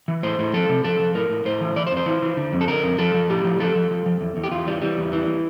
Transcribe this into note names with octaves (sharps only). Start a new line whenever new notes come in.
E3
A2 C5
A2
F3 A4
C3
F3 A4
F3
A2 A#4
A2
A2 C5
E3
E3 D5
C5
F2
C5
E3
E3
D3
F2
A4
D3 A#4
F2
F3 A4
F3
A2 G4
F3
F3 A4
F3
F3
F3
E2
E2
G4
E2 F4
E3 G3
E3 G3
E2
E3